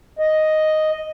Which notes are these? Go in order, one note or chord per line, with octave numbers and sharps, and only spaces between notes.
D#5